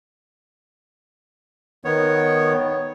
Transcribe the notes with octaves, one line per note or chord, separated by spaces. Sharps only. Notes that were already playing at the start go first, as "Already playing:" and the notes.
D#3 B3 C#5